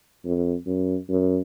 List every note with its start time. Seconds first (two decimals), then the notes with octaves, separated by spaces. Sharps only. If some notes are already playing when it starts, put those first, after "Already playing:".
0.25 F2
0.66 F#2
1.09 F#2